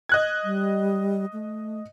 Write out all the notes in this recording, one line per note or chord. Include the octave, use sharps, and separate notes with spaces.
D#5 F#6 G#6
G3
A3